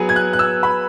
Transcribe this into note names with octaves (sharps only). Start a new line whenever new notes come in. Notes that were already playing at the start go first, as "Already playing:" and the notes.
Already playing: F#3 B3 G#4 B4
G#6
F#6
F#6
E6
B5